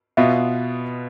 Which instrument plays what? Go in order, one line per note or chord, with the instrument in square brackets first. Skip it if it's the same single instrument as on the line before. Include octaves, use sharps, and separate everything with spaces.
[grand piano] B2 B3 F4 [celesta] E5